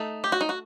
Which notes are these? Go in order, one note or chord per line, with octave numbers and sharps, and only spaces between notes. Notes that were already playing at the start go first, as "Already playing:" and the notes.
Already playing: A3 D#4 A4
G4
F#4
D#4
F#4